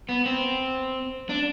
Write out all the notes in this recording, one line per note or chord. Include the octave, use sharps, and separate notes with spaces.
B3
C4
D4